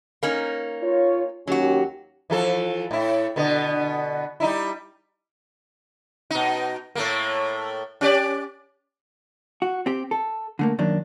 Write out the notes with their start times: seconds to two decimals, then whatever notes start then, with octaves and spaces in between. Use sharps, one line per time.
0.23 A#3 C#4 D#4
0.82 F4 C#5
1.47 D#2 F#3 C#4 F#4 G4
2.30 E3 F3 A4
2.91 A2 E4
3.36 B2 D3 B3
4.40 G3 D#4 E4
6.31 B2 D#4
6.95 A2 A3 A#3
8.01 C#4 G4 D5
9.62 F#4
9.86 C4 G4
10.11 A4
10.59 D3 A3 A#3
10.79 F#2 D#3 A#3 D4